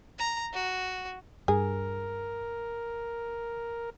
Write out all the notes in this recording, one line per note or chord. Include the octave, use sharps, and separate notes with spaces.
A#5
F#4
G2 G#4 A#4